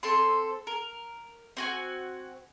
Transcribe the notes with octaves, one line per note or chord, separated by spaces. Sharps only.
C4 A4 C6
A#4
C4 F#4 G#5